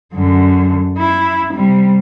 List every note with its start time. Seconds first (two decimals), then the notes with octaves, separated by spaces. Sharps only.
0.14 F#2 D3
0.98 E4
1.53 C3 G3